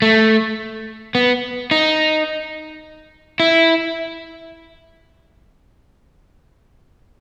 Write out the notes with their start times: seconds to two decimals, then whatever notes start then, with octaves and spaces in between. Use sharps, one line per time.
0.02 A3
1.15 B3
1.71 D#4
3.40 E4